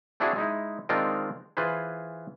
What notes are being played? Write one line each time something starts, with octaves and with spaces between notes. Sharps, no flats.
C4 D4 E4 F#4 G#4
G#3 D#4 E4
D#3 G#3 C4 D4 F4 A#4
E3 F4 G#4 B4 C5